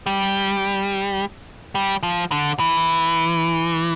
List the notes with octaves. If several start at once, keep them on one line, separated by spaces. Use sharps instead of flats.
G3
G3
F3
D3
E3